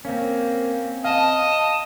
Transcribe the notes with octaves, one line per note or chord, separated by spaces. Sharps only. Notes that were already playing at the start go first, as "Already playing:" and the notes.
A#3 C4 C#4
D#5 F5 A5